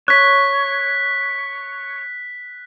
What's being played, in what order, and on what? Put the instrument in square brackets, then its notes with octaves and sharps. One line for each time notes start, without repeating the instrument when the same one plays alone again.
[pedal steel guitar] C#5 [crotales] F#6 B6